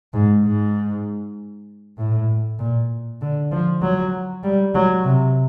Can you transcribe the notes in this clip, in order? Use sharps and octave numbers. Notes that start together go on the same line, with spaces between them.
G#2
G#2
A2
A#2
D3
F3
F#3
G3
F#3
C3